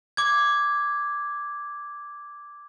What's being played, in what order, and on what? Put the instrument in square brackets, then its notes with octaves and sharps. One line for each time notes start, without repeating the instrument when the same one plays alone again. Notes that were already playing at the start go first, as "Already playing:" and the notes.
[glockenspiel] D6 G#6